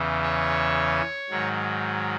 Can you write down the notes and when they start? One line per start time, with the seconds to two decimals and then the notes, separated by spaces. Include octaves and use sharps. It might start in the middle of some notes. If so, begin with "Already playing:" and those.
Already playing: E2 C#3 E3
0.23 C#5
1.30 G#2 D#3 F#3